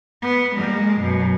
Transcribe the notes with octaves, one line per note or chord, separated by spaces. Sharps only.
B3
G#3 A#3
F#2 B2